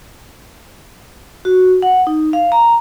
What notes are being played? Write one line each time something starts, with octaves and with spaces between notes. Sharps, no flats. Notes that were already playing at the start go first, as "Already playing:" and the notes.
F#4
F#5
D#4
F5
A#5